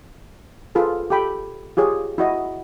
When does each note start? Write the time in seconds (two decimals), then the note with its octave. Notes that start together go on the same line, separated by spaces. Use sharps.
0.75 F4 G#4 A4 B4
1.10 G4 A4 G5 B5
1.77 F4 G4 G#4 C#5
2.18 E4 F#4 D#5